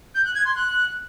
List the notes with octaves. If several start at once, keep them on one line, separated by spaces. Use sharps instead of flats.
G6
F#6
G#6
C6
F#6